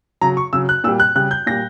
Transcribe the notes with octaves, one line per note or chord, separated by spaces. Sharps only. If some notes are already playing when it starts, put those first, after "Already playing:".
C#3 F#3 A#5
C#6
C#3 F#3 E6
F#6
A#2 G3 E6
F#6
C#3 G3 F#6
G6
A#2 G3 A#6